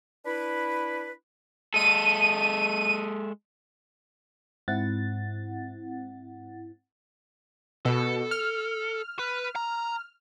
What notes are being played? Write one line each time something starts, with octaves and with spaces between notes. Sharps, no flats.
D4 E4 B4
G#3 A4 D#7
G#2 C4 E4 F#5 A6
B2 A4
F6
B4
A#5